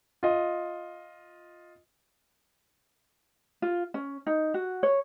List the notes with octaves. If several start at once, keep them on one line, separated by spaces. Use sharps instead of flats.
F4 D#5
F4
C#4
D#4
F#4
C#5